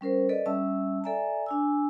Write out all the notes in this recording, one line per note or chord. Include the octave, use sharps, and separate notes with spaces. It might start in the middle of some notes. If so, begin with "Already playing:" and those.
G3 C#4 A#4 C5
A4 B4 D5 D#5
G3 C#4 E5 A5 E6
A4 D5 E5 G#5 A#5
D4 G#5 E6